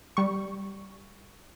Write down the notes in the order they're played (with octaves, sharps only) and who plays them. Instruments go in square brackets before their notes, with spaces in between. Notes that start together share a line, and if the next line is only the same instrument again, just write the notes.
[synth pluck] G3 C#6